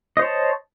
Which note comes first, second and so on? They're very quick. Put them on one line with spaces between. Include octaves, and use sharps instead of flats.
D#5 C5 C#5 A5